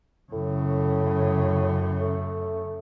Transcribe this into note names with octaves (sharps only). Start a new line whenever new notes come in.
F#2 A2 C#3
A3